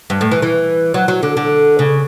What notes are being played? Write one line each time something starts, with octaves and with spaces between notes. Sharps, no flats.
G2
A2
E3
E3
F#3
F#3
D3
D3
C#3